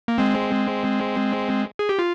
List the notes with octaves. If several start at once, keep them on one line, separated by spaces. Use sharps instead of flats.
A#3
G#3 C4
G#4
G4
F4